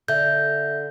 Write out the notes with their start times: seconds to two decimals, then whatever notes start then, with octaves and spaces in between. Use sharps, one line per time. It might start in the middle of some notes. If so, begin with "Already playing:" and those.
0.08 D3 E5 G6